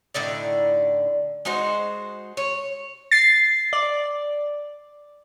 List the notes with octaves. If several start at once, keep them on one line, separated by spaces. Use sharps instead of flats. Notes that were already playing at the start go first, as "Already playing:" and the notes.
A2 D3 D#4 D5
G#3 D#4 F#4 C5
C#5
A6 C7
D5